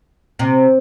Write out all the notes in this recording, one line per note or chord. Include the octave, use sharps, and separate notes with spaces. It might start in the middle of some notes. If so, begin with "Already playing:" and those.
C3